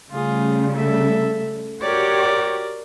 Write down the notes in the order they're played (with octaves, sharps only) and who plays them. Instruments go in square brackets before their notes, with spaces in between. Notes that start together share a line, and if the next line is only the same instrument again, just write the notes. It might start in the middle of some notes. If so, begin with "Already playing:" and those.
[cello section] C#3 G3 A3 [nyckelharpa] F4 G#4
[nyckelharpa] A4 E5
[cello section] F#4 G4 C#5 [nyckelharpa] A#4 D5